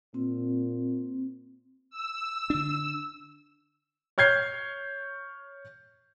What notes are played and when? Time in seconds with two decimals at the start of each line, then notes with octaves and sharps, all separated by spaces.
0.14 A#2 C4
1.90 E6
2.50 D3 D4
4.18 C#5 F6 G6 G#6 C7